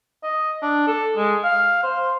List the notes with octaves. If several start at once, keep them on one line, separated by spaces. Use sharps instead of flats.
D#5
D4
A4
G#3
F5
C5